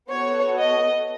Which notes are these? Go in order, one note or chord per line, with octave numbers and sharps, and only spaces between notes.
B3 F#4 A4 C#5
D#5